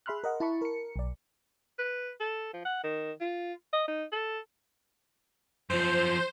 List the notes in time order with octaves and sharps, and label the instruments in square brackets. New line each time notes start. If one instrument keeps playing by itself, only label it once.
[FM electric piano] G#4 E5 B5 C6 F6 F#6
A#4 D#5 F#5
E4 A5 B5 C#6
A#4 C#7
B1 D5
[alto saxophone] B4
A4
F3
F#5
D#3
F4
D#5
D#4
A4
[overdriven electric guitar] F#2 F3 [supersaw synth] C5